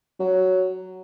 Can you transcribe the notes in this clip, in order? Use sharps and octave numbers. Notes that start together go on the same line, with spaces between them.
F#3